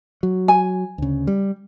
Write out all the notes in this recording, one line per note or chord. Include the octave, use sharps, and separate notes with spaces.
F#3
G#5
D2 C#3
G3